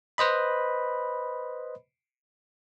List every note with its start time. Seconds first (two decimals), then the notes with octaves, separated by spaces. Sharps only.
0.18 B4 C5 D#5 B5